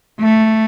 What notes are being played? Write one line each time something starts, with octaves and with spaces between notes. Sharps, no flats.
A3